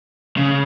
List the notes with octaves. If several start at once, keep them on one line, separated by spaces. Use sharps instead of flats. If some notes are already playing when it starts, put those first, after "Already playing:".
C#3